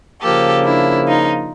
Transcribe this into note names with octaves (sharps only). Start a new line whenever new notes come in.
C#3 F3 A#3 G4 A4
D4 E4
D#4 F4